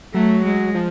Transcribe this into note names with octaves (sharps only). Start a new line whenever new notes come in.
F#3 A3
G#3
F3